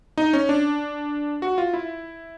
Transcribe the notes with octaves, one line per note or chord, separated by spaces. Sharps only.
D#4
C#4
D4
F#4
F4
E4